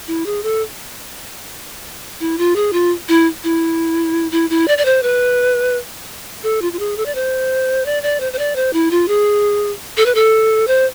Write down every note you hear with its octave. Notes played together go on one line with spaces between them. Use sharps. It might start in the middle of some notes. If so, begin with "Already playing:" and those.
E4
G#4
A4
E4
F4
G#4
F4
E4
E4
E4
E4
D5
D5
C5
B4
A4
F4
F4
G#4
A4
D5
C5
D5
D5
C5
C5
D5
C5
E4
F4
G#4
A4
B4
A4
C5